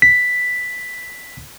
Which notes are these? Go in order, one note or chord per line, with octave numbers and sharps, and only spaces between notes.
B6